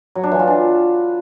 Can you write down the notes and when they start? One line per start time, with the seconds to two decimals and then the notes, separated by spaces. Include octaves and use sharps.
0.15 F#3
0.23 D4
0.31 E3
0.40 F4
0.48 D4